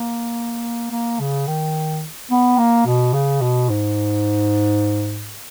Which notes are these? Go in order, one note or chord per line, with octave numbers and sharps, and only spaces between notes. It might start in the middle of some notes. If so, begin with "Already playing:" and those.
Already playing: A#3
A#3
C#3
D#3
B3
A#3
B2
C#3
B2
G#2